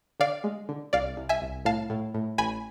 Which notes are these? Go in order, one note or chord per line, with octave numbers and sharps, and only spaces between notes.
D3 D5 F5
G#3
D3
C2 D5 F5
C2
E5 G#5
C2
A2 F5 A5
A2
A2
A1 G#5 B5